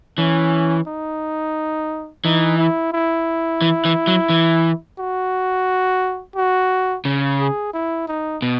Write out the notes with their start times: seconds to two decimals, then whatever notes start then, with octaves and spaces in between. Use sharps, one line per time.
0.18 E3 C#4
0.87 D#4
2.24 E3 D#4
2.58 E4
2.92 E4
3.62 E3
3.85 E3
4.07 F#3
4.30 E3
4.99 F#4
6.36 F#4
7.05 C#3
7.40 G#4
7.73 E4
8.08 D#4
8.42 B2